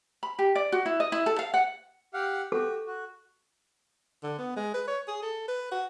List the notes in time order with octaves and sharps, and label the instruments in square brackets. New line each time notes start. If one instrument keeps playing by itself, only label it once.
[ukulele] B5
G4
D5
F#4
E4
D#5
E4
A4
F5
F#5
[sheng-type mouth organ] G4 F5 F#5
[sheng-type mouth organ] F#4 G4 [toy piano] A4
[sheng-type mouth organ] F#4
[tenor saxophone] D3
B3
G#3
B4
C#5
G#4
A4
B4
F#4